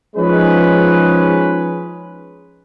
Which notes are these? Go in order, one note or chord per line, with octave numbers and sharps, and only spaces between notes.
F3 G#3 C#4 D#4 G#4 B4